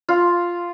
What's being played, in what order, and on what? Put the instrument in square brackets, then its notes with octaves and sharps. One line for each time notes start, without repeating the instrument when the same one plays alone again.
[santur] F4